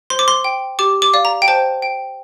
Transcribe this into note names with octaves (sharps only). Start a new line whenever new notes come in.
C5 C6
D6
C6
G5
G4 D6
D6
D5 F5
A#5
G5
C5 A5
G5